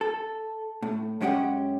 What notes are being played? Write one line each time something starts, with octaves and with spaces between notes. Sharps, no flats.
A4
A2
F#2 G#3 C#4 G4 F#5